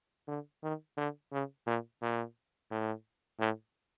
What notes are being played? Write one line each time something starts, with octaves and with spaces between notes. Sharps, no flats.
D3
D#3
D3
C#3
A#2
A#2
A2
A2